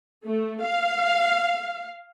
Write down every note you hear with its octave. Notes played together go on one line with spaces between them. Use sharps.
A3
F5